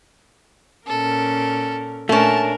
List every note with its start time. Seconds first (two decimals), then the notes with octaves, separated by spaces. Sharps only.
0.87 A#2 C#4 A4 A#4
2.09 A#2 A3 C#4 D4 A#4 A5